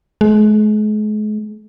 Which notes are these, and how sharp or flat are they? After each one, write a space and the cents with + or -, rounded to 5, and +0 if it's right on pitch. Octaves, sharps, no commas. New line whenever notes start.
G#3 +40